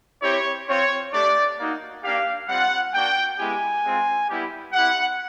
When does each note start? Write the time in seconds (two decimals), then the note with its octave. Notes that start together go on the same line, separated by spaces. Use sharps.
0.22 C4 E4 G4 C#5
0.67 C4 F4 C#5
1.12 A3 D4 G4 D5
1.58 A#3 D#4 F#4
2.03 A#3 D4 G4 F5
2.47 G3 C4 F4 F#5
2.92 A#3 D4 F#4 G5
3.38 G#3 B3 E4 G4 G#5
3.83 G#3 C4 F4
4.28 G3 B3 E4 G4
4.73 C4 E4 G4 F#5